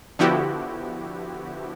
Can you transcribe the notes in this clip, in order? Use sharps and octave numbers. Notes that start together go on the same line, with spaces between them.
D3 F3 B3 E4 F#4 G4